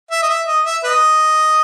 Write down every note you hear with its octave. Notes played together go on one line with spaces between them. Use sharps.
E5
D#5
E5
D#5
E5
B4 D#5